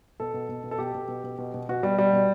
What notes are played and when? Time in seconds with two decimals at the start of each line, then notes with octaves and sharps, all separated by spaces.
0.20 B2 A4
0.34 B2
0.49 B2
0.63 B2
0.71 A4
0.78 B2 G4
0.94 B2
1.08 B2
1.24 B2
1.38 B2
1.54 B2
1.69 B2 F#4
1.83 B2 G3
1.98 B2 G3
2.13 B2